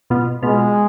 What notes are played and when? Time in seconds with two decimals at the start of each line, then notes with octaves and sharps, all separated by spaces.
0.10 B2 B3 F4
0.43 B2 G#3 B3 F4